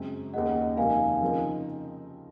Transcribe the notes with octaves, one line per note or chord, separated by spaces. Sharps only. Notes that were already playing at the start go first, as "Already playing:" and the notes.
Already playing: F#2 C#3 G#3 C4
D#2 D#3 A#3 C#4 G#4 D#5 F#5
F2 C3 D#3 A#3 F5 G#5
C#3 F3 C4 D#4 A#4